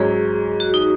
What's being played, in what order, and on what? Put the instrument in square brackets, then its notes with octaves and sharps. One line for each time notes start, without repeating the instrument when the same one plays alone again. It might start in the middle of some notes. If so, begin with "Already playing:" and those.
Already playing: [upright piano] G#2 F#3 C#4 [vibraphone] G#4
[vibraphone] F#4
D#4